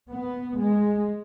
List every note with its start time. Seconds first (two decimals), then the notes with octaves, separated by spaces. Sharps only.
0.09 B3
0.58 G#3